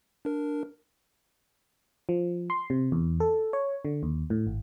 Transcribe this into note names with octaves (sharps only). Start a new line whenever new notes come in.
D4 A#4
F3
C6
C3
E2
A4
C#5
D3
D#2
A2
G#1